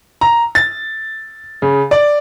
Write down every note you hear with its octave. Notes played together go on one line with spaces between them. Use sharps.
A#5
A6
C#3
D5